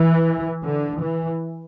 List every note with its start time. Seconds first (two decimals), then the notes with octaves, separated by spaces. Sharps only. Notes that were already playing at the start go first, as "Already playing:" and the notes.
Already playing: E3
0.65 D3
1.03 E3